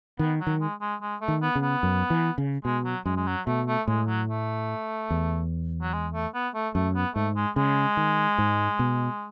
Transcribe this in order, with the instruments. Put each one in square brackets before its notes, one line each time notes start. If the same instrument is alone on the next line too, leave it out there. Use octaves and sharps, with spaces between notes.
[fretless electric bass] D#3 [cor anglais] B3
[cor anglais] F#3
[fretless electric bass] D#3
[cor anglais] G#3
G#3
G#3
A3
[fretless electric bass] D#3
[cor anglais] B3
[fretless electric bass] C#3
[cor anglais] B3
[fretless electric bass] F#2
E3
C#3
[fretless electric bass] B2 [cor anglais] G#3
[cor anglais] F#3
[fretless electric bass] F#2 [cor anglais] G#3
[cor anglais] G#3
F#3
[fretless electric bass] B2 [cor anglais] A3
[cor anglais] A3
[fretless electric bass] A2 [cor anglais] G#3
[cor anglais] F#3
A3
[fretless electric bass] E2
[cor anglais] F#3
G#3
A3
B3
A3
[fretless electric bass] F#2 [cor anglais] A3
[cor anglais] B3
[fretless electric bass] G#2 [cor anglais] A3
[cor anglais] G#3
[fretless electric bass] C#3 [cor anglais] G#3
[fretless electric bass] D#3
G#2
B2